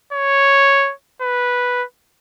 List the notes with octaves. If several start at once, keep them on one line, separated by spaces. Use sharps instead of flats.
C#5
B4